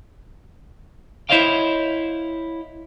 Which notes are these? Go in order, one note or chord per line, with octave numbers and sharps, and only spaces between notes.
E4 C5 C#5 D#5 F5 G5